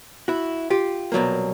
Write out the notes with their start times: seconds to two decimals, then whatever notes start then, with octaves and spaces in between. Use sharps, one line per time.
0.28 E4 F#4
0.70 F4 G4
1.12 C2 B2 F#3 A#3